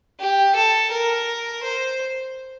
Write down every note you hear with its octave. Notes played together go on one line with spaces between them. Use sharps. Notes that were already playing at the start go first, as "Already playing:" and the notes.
G4
A4
A#4
C5